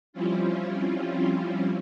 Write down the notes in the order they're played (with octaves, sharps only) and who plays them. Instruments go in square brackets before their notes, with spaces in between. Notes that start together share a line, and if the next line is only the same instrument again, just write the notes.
[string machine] F3 G3 C4 C#4 E4 F4